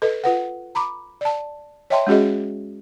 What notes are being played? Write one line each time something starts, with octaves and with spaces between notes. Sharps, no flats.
A4 B4 D#5
F4 B4 F#5
A#5 B5 D6
D5 A5
C#5 D#5 E5 G5 A5 C6
G#3 C#4 F#4 G#4 D#5